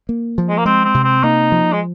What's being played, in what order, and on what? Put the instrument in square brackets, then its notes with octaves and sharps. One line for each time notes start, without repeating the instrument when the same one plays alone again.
[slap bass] A#3
F3
[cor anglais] G#3
A#3
[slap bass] G#3 [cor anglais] C4
[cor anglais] C4
[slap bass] C3
[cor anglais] C4
[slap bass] A#3 [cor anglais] D#4
[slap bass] F3
[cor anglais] G#3